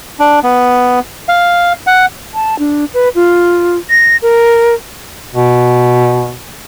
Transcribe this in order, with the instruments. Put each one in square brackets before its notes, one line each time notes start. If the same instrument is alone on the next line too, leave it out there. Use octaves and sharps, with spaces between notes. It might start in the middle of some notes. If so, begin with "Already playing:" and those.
[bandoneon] D4
B3
F5
F#5
[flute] A5
D4
B4
F4
A#6
A#4
[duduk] B2